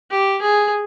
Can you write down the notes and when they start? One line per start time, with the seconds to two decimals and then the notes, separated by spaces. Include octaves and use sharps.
0.10 G4
0.42 G#4